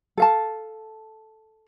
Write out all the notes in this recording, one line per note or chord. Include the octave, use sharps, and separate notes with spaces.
A4 F5 A5